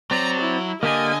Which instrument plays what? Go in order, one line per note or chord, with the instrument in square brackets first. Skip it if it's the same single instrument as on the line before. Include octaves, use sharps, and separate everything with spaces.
[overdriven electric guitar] F#3 [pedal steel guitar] C4 D5 [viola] A#5
[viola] E4
[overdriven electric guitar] D3 [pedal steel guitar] A#3 G4 A#4 [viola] D#5 G#5